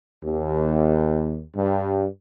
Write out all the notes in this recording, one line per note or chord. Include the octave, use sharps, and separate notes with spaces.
D#2
G2